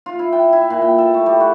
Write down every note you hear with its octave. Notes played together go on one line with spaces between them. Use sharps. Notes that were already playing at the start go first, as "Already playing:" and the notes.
F4
E4
G5
E4
A#2
G5
A4
A3
G3
F#4